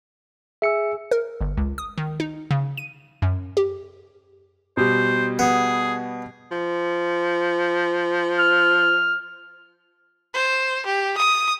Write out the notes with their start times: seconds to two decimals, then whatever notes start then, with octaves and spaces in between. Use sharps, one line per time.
0.62 G#4 E5 G#5 E6 C#7
1.11 A#4
1.41 G1
1.57 C#2
1.78 D#6
1.98 D#3
2.20 D#4
2.51 C#3
2.77 D#7
3.22 F#2
3.57 G4
4.77 B2 G3 C5
5.39 B3 G#4
6.51 F3
8.38 F6
10.34 C5
10.86 G4
11.18 D#6